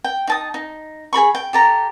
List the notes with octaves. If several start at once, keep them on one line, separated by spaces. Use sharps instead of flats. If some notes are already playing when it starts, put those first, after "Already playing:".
G5
D#4 A5 D#6
D#4
G#4 A#4 B5 C#6
G5
G4 A4 A#5